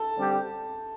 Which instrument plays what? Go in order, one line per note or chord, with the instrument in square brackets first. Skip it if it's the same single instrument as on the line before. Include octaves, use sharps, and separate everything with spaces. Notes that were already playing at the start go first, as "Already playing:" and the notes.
Already playing: [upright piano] A4 A5
[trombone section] D3 G3 C4 G4